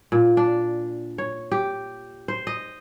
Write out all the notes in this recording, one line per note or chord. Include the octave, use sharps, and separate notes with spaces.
A#2
D4
C#5
G4
C5
D#5